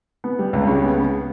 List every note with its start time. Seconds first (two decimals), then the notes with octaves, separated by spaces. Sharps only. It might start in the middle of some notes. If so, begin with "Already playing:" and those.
0.24 B3
0.39 G3
0.53 C#2
0.67 C#3
0.82 B3
0.97 B3